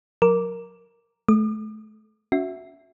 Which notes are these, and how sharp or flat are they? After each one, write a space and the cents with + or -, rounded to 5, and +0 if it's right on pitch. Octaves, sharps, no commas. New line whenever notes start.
F#3 -25 A#4 +0 D6 -10
A3 -35 D6 +45
C#4 +30 F#4 -20 E5 +0